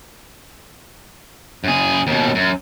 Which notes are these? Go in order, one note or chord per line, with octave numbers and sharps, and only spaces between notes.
F#2 G#4
D#2 B2
F#2